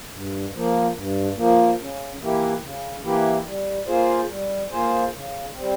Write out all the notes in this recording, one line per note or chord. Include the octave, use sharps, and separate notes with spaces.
G2
F3 A#3
G2
F3 A#3
C#3
E3 A#3 E4 G4
C#3
E3 A#3 E4 G4
G3
A#3 F4 G#4 C5
G3
A#3 F4 G#4 C5
C#3
G3 C4